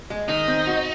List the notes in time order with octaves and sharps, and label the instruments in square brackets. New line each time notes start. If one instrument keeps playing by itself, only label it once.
[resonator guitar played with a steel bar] G#3
[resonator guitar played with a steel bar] D#3 [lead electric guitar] D#4
[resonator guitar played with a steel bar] C4
F#4